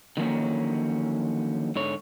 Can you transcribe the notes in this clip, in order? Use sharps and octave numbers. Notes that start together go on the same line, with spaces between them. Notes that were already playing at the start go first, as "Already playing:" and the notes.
D3 D#3 F3 F#3 A#3 C#4
G#2 D3 C#5